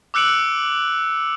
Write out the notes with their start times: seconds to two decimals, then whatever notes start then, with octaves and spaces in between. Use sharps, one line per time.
0.14 D6 E6 F#6 C#7 D7 F#7